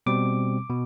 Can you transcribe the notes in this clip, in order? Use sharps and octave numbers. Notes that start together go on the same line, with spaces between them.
B2 G3 C4 D6
B2